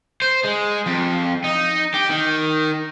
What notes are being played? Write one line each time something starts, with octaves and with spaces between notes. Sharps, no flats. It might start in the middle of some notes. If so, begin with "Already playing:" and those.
C5
G#3
F2
D#4
G4
D#3